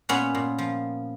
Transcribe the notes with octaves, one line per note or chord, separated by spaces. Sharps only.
A#2 B3 C#4
A#2
F3